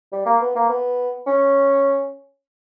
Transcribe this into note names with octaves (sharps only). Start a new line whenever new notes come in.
G3
A#3
B3
A#3
B3
C#4